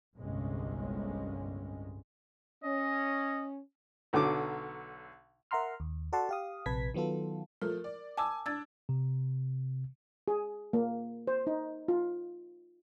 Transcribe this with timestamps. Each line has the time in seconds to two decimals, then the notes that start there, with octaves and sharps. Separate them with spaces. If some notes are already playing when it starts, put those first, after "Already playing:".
0.16 G1 C2 A2 C3 G#3 C#4
2.64 C#4 D#5
4.13 B1 D3 F#3 D6
5.51 A#4 E5 F#5 A#5 C6 F6
5.80 D#2
6.13 F#4 A4 D5 F#5 A5 C6
6.29 G4 F5 D#6
6.66 A#1 C3 B4 A5 G#6 B6
6.94 D#3 F#3 B3 F4 A4
7.62 F3 A3 A#4
7.84 D5
8.17 G#5 A5 D6 E6
8.46 D4 E6 G#6 A6
8.89 C3
10.28 G#4
10.73 A#3
11.27 C5
11.47 D#4
11.88 F4